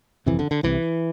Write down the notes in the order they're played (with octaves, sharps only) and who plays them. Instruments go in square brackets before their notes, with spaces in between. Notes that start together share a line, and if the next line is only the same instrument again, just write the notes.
[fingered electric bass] G1 F2 C3 E3
D3
D3
C2 C3 E3